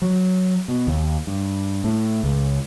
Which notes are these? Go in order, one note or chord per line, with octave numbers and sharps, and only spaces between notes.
F#3
B2
D#2
G2
A2
C#2